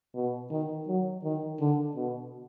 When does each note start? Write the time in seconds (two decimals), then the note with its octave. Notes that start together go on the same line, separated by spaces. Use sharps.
0.15 B2
0.51 D#3
0.88 F#3
1.24 D#3
1.60 D3
1.96 B2